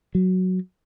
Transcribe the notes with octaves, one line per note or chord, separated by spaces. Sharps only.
F#3